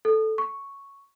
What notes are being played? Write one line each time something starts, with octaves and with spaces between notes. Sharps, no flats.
A4
C#6